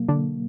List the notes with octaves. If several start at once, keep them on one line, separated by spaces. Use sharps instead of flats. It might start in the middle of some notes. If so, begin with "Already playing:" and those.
Already playing: B2 F#3 A#3
D3 D4